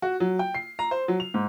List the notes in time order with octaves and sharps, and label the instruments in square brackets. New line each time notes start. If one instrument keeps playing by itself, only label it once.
[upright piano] F#4
F#3
G5
C7
A#5
C5
F#3
F7
G#2